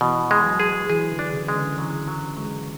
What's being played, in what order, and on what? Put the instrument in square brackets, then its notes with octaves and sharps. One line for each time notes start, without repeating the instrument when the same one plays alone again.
[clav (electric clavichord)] B2 [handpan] E3
[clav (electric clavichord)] G#3
[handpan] F#3
[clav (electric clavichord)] G#4
[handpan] E3 [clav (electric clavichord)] G#4
[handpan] D3
[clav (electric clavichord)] D4
[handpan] C#3
[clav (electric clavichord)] G#3
[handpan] D3
[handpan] E3 [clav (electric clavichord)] F#3
[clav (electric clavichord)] F#3
[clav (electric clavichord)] F#3 [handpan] G#3